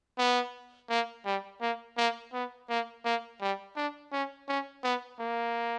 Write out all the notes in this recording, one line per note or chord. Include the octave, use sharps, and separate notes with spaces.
B3
A#3
G3
A#3
A#3
B3
A#3
A#3
G3
D4
C#4
C#4
B3
A#3